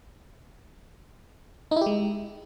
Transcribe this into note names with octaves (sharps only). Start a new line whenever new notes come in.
D#4
E4
G4
G#3